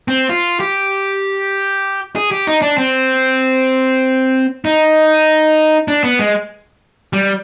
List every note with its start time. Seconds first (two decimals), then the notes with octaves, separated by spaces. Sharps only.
0.08 C4
0.29 F4
0.60 G4
2.16 G#4
2.32 G4
2.47 D#4
2.62 D4
2.78 C4
4.65 D#4
5.88 D4
6.04 B3
6.19 G#3
7.13 G3